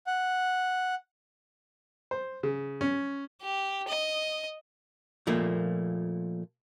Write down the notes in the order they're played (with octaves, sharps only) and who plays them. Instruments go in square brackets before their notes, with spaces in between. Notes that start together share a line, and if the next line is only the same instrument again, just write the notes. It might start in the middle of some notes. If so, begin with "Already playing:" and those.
[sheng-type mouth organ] F#5
[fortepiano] C5
C#3
C#4
[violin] G4
D#5
[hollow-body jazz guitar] A#2 F3 A3 A#3